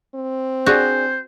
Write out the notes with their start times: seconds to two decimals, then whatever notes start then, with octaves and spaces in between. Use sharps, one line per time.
0.15 C4
0.66 D4 F#4 G#4 C5 D5